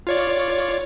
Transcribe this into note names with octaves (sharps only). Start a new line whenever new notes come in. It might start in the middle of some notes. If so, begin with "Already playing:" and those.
F4 C#5 D5